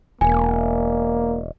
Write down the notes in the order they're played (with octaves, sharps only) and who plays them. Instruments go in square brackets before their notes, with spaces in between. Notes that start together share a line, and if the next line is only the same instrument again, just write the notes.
[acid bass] E1 [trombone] A#3 [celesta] G#5